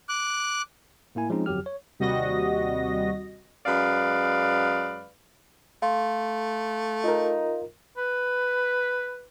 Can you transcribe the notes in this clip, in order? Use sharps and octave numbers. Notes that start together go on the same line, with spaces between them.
D6 F#6
A2 A#3 E4 G#5
F3 G#3 C4 C#4 D#4
G1 F2 F#3 G4 F6
C#5
D#2 C3 G3 F#4 D#5 A#6
F#2 G#3 B4 D5 F5
A3 F5 C6
D#4 F4 A#4
B4